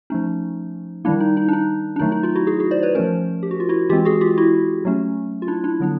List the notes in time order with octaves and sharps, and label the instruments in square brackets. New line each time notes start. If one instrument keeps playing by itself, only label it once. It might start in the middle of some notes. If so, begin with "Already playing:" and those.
[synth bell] F3 A3 C#4 D#4
D#3 G3 A#3 D4 E4
D#4
D#4
D4
D#4
D4
D#3 F#3 A3 D#4
D#4
D#4 F4
E4 F#4
F#4 G#4
F#4 G#4
C5 D5
B4 C#5
F3 A3 C#4 A#4 C5
G4
F#4
F4
E4 F#4
E3 G#3 C4 F4 G4
F#4 G#4
F4 G4
E4 F#4
F#3 A3 C#4
F4
D4 E4
D4 E4
D3 F#3 B3 D4